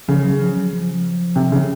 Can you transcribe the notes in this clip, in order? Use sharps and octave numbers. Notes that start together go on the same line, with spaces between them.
C#3 F3
F#3
F3
F#3
F3
C3
C#3